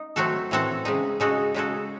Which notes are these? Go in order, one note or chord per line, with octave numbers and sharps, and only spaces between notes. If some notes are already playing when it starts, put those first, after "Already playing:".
Already playing: D#4
F#3 A3 C4 F#4 A4
A2 E3 C4 F#4 A4
C#3 G#3 D#4
C#3 G#3 D#4 F#4 A4
C#3 G#3 D#4 F#4 A4